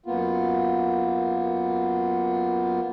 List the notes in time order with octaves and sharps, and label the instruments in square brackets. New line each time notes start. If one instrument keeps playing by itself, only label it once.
[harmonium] F#2 A#3 B3 F4